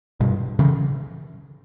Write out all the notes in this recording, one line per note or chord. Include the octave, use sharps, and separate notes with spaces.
G2 B2
C#3 E3